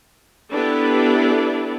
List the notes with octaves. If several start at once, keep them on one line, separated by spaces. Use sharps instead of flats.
B3 D4 E4 G4 A4 B4